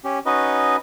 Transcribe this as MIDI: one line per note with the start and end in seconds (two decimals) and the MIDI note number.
0.04 0.19 61
0.04 0.19 67
0.26 0.76 61
0.26 0.76 63
0.26 0.76 66
0.26 0.76 71
0.26 0.76 75